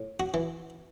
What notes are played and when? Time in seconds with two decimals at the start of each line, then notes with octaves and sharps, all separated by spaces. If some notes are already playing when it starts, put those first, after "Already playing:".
Already playing: A2
0.20 F#4
0.34 E3